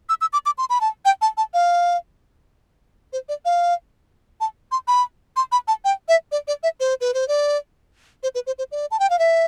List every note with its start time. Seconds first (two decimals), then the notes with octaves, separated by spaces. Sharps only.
0.09 E6
0.21 E6
0.33 D6
0.46 D6
0.58 C6
0.70 B5
0.81 A5
1.05 G5
1.22 A5
1.37 A5
1.54 F5
3.13 C5
3.29 D5
3.45 F5
4.41 A5
4.72 C6
4.88 B5
5.36 C6
5.52 B5
5.68 A5
5.85 G5
6.08 E5
6.32 D5
6.48 D5
6.63 E5
6.80 C5
7.01 B4
7.14 C5
7.28 D5
8.23 C5
8.35 B4
8.47 C5
8.59 C5
8.72 D5
8.91 A5
8.99 G5
9.10 F5
9.19 E5